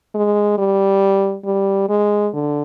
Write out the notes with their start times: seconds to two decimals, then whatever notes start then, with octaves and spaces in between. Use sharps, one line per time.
0.14 G#3
0.58 G3
1.45 G3
1.89 G#3
2.33 D3